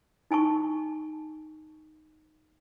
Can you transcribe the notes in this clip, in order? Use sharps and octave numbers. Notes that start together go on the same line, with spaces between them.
D#4 G#5 A5 C#6